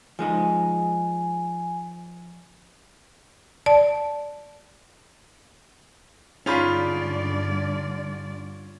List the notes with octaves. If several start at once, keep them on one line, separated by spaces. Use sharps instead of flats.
F3 G#3 D#4 G#5
D5 A5
G2 D3 C#4 D#4 F4 G#4 D5 B5